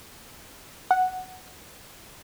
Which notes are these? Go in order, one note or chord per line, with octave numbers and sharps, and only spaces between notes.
F#5